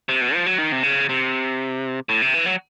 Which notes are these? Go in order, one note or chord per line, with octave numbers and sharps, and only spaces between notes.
C3
B2
F3
F#3
D#3
C3
C#3
C3
A2
C3
E3
F#3